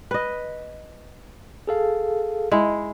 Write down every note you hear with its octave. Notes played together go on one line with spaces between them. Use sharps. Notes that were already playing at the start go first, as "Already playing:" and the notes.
B4 D#5
G#4 A4 F5
G#3 E4